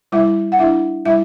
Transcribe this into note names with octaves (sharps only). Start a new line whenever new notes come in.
G3 E4 E5
F#5
D4 E4 E5
G3 E4 E5